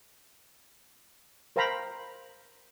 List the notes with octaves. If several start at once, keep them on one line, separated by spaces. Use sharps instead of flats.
A#4 C5 F5 G5 A#5 B5